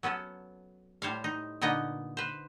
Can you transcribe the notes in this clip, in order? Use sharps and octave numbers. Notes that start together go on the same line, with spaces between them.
F#3 B3 C#4 A4
A2 G3 C5 C#5 F5
D#4
A#2 D3 B3 D#4 D#5
B4 C5